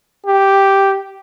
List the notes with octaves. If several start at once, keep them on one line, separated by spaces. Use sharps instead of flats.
G4